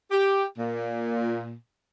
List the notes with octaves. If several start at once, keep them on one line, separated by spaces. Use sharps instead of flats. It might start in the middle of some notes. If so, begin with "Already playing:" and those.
G4
A#2